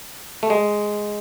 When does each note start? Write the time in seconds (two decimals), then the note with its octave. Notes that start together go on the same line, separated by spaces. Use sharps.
0.43 A3
0.50 G#3